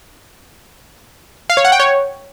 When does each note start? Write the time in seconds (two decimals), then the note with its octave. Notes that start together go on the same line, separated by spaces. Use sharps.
1.50 F5
1.57 C#5
1.65 F#5
1.72 G5
1.80 C#5